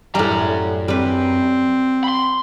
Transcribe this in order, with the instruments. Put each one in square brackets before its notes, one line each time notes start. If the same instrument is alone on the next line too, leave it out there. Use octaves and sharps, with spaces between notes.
[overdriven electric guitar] F#2 A#5 [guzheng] A2 G3
[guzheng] G3 B4 [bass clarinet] C4
[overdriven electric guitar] B5 C6